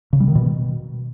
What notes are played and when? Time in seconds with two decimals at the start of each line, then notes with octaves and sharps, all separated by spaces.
0.13 C#3
0.20 G3
0.28 D#3
0.35 B2